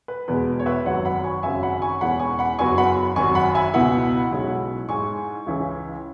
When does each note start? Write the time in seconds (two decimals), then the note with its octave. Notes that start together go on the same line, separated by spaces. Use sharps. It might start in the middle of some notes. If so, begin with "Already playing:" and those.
0.08 B4
0.28 E2 B2 G#3 B4
0.60 C#5
0.66 B4 E5
0.85 G#1 F#2 F#3 C#5 F#5
1.05 F#5 B5
1.24 G#5 C#6
1.43 G#1 F#2 C#3 F#3 C#4 E5 G#5
1.63 F#5 B5
1.82 G#5 C#6
2.01 E1 E2 E3 C#4 F#5 B5
2.20 G#5 C#6
2.39 F#5 B5
2.59 F#1 F#2 F#3 B3 G#5 C#6
2.78 F#5 B5
3.16 G#1 F#2 F#3 G#5 C#6
3.35 F#5 B5
3.55 E5 G#5
3.74 C#2 B2 B3 E4 F#5 B5
4.32 B1 B2 G#3 C#4 E4
4.89 G#2 G#3 E4 G#5 C#6
5.46 C#2 C#3 E3 C#4 E4